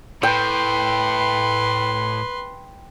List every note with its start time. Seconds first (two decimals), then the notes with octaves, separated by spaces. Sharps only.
0.23 A2 B4 G5 C6